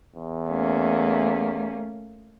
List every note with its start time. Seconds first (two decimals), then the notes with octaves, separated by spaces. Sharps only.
0.16 E2
0.48 A3 A#3 C#4